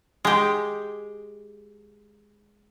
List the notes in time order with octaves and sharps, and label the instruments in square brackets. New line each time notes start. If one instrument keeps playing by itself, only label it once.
[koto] G#3 G4